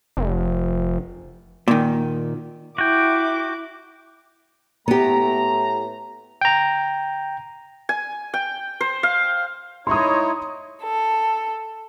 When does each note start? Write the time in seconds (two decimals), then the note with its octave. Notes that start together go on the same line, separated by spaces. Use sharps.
0.17 F1
1.68 A#2 D#3
2.78 E4 F#4 G5 D6
4.88 A2 A3 B3 G4 A#5
6.41 G5 A#5
7.89 G#5
8.34 G5
8.81 C5
9.03 F5
9.87 D#4 E4 C#5 C6 D#6
10.83 A4